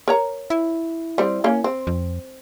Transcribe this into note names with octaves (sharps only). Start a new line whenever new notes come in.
A#4 C#5 A#5
E4
G3 C4
A#3 C#4
C4
F2